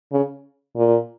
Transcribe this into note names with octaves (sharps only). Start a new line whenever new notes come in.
C#3
A#2